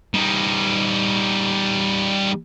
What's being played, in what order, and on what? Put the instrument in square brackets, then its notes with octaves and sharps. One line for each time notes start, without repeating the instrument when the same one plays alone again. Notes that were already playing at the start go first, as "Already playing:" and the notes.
[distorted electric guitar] G3 D#4